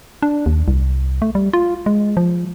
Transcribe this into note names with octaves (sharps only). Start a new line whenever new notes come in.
D4
D#2
C2
A3
G3
F4
G#3
F3